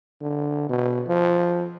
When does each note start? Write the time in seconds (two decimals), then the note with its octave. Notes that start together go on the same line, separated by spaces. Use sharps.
0.21 D3
0.69 B2
1.08 F3